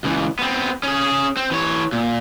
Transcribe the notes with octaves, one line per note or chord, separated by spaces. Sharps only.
C#2 E3
B3 C4
C#4 G#4
C4
E3 C#5
A#2